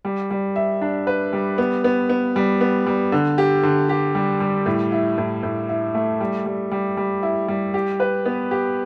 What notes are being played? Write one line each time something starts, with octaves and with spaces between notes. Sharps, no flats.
G3
G3
E5
D4
B4
G3
B3
B3
B3
G3
B3
G3
D3
G4
D3
G4
G3
G3
A2
E4
A2
A2
E4
A3
G3
G3
G3
G3
E4
G3
G4
B4
B3
G4